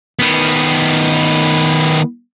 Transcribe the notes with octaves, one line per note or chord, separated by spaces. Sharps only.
D#3 B3